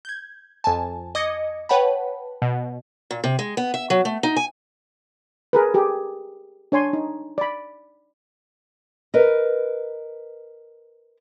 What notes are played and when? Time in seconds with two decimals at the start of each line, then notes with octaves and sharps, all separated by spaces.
0.05 G6 G#6
0.64 F2 G#5 A5
1.15 D#5 D6 D#6 G#6 A#6 C#7
1.69 B4 C#5 F#5 G5 A5 B5
2.42 B2
3.11 A#2
3.24 C3
3.39 G#3
3.57 B3
3.74 E5
3.90 F#3
4.05 A3
4.23 D#4
4.36 G#5
5.53 G#4 A#4 B4
5.74 G4 G#4
6.72 D4 C#5 G#5 C6
6.93 D#4
7.38 D5 B5
9.14 A#4 B4 D#5